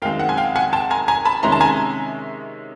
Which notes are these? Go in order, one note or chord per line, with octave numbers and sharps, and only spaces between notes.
F#2 D#3 G#3 C4 F5 G5
F#5
G#5
F5 G5
F#5 G#5
G5 A5
G#5 A#5
G#5 A#5
A5 B5
C3 D#3 G#3 C#4 E4 A#5 C6
A5
G#5 A#5